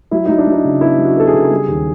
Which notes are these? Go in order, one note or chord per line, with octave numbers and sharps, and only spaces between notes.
F#3 E4
F#3 D#4
D4
F#3
D#4
C#3
B3 E4
F#3
F#4
B3 A4
G#4
C#3
G3
D#2